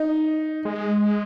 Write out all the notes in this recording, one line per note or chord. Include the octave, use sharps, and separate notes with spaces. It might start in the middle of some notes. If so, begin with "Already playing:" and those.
Already playing: D#4
G#3